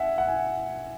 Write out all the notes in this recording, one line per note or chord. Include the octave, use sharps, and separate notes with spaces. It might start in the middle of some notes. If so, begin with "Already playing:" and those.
Already playing: E5 F#5 G#5
F#5
G#5